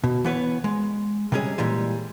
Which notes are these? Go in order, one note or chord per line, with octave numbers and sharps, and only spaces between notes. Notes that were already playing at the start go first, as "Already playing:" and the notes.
B2
E3 B3 B4 C#5
G#3
C3 G3 G#3 C#4 G#4
A#2 E3 G3 G#3